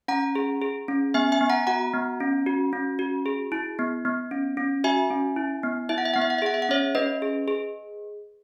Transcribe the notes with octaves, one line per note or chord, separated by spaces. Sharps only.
C#4 F#5 A#5
G#4
G#4
C#4
B3 E5 G#5
E5 G#5
B3
F#5 A#5
F#4 F#5 A#5
B3
C#4
F#4
C#4
F#4
G#4
E4
B3
B3
C#4
C#4
F#4 E5 G#5
C#4
E4
B3
E4 E5
F#5
E5
B3 F#5
E5
F#5
E5
G#4 F#5
E5
F#5
C#4 C#5 E5
C#4 B4 D#5
G#4
G#4